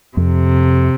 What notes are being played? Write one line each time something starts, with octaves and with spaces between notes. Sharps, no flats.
F2 C3